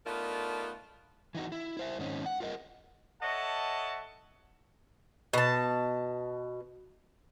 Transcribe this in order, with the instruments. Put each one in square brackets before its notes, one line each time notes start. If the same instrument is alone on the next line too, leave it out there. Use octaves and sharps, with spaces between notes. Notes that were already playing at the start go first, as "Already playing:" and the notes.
[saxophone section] A3 B3 D4 D#4 F4 A#4
[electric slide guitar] E3 D#4 F#4
E4
E4 C5 E5
G#2 D#3 C4 C#4 D#4
F#5
F4 G#4 A#4 D#5
[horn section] A4 C#5 D#5 E5 F#5 A5
[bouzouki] B2 A5